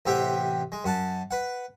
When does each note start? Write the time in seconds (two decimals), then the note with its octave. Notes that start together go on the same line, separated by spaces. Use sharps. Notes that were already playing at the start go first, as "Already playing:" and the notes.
0.06 A1 C3 G4 E5 F#5 G5
0.72 G#3
0.85 F#2 F#5 A5
1.31 B4 F#5